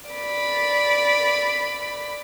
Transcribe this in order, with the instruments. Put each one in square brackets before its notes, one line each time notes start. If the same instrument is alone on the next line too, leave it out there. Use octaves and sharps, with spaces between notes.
[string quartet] D5 B5